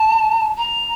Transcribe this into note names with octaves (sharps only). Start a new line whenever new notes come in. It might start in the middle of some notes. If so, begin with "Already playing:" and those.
Already playing: A5
A#5